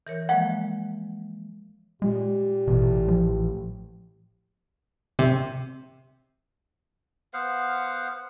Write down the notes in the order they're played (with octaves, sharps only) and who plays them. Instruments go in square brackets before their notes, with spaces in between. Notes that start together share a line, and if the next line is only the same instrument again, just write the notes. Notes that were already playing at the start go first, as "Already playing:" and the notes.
[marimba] E3 A#4 C#5
[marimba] F3 G#3 A#3 [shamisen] F#5
[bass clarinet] A#2 [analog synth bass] G#3 [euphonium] G4
[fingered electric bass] A1 [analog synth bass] B2
[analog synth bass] F3
[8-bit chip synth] C3
[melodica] B3 C5 F5 F#5